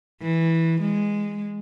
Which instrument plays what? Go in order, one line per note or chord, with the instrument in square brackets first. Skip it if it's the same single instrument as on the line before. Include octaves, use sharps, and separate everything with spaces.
[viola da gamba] E3
G#3